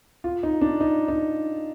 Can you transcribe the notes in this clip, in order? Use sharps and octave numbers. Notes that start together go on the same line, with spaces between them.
F4
D#4
D4
D#4
D#4